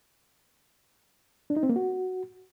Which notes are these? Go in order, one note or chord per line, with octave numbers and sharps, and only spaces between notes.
D4
D#4
C4
A#3
F#4